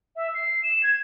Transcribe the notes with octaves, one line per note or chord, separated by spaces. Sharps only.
E5
C7
E7
G#6